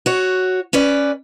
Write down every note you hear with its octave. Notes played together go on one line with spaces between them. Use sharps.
F#4 C#5
C#4 B4 D5